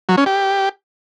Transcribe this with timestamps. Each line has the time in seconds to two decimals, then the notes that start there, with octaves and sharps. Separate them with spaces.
0.09 F#3
0.17 C#4
0.26 G4